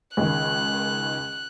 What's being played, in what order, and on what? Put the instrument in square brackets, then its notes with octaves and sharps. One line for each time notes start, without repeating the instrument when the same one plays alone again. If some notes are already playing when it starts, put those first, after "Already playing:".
[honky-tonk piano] C#2 D#3 [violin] F#6